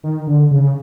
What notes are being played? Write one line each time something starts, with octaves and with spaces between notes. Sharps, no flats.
D#3
D3
C#3